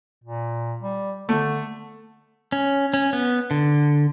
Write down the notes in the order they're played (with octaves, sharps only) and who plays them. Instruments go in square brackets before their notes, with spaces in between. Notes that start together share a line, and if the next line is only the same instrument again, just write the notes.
[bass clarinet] A#2
G3
[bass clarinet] D3 [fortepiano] A3
[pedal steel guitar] C#4
C#4
B3
D3